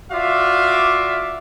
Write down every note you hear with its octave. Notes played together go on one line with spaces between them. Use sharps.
F4 F#4 D5 E5 F5 D6